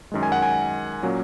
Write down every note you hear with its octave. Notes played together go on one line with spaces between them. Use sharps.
F#2 D#3 G#3
G#5
F#5
G#5
A#2 F#3 A#3 C#4